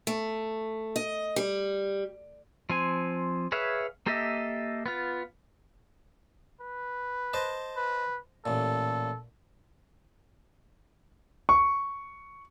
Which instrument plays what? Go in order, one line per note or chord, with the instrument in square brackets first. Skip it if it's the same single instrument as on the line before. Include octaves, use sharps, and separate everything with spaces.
[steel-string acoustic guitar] A3
D#5
G3
[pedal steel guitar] F3 C4 G#5
G#4 B4 C#5 E5 F5
A#3 G4 A4 D#5 E5
B3 F4
[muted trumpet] B4
[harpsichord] C5 D#5 A5
[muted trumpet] B4
[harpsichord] A1 A#2 [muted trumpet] A4
[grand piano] C#6